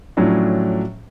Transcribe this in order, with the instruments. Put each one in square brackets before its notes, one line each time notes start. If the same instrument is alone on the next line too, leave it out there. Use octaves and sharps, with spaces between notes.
[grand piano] A2 F3 F#3 C#4 D4